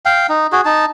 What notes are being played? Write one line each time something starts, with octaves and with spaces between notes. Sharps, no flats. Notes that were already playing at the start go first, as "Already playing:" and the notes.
F5 G5
D#4
F#4 G#4
D#4 A5